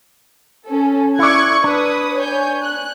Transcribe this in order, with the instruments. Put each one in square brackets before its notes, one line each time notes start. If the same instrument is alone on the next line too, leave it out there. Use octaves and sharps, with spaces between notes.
[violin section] C#4 A4
[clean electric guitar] E4 D5 [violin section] C#6 F#6 G#6
[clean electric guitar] D4 [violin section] B4 D#6
[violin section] C#5 G#5 G6
F#6